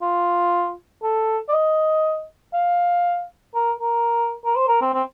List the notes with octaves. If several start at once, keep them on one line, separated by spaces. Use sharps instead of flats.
F4
A4
D5
D#5
F5
A#4
A#4
A#4
C5
A#4
C4
C4